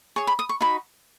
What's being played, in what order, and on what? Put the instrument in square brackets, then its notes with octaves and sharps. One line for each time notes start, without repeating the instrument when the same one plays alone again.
[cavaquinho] G#4 C#5 C#6
B5
D#6
C#6
D#4 F#4 B5